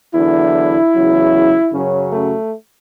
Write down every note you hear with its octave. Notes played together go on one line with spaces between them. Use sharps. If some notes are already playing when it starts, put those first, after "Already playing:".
E2 D3 F#3 E4
E2 C#3 F#3
F#2 C#3 F#3 C#4
A3